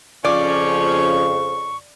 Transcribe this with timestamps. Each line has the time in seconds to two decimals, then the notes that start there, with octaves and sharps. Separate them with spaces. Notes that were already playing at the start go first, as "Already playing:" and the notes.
0.25 F2 C#3 F3 C#4 D5 C#6